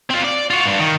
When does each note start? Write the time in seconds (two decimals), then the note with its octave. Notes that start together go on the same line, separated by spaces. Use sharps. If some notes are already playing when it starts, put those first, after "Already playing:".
0.10 C4 F4
0.24 D5
0.50 F4 F#4
0.66 G2
0.79 D#3